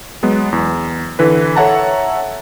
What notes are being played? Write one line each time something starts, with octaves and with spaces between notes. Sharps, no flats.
F#3 G#3 B3
E2
D3 E3 B4
A4 C#5 E5 F#5 A5 A#5